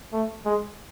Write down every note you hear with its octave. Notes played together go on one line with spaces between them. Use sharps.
A3
G#3